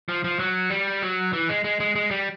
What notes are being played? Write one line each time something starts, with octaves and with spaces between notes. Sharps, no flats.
F3
F3
F#3
G3
F#3
E3
G#3
G#3
G#3
G#3
G3